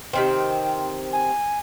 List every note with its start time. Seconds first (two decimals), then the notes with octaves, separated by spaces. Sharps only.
0.13 C3 D#3 C4
1.13 G#5